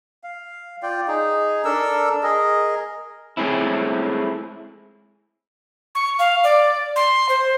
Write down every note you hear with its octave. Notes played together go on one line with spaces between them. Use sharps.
F5
F4 D5 G5
D#4 G#4
D4 A4 A#4 E6
G#4 A#4 D#5
G#3 A3 C4 C#4 E4
C#6
F5
D5
C6
C5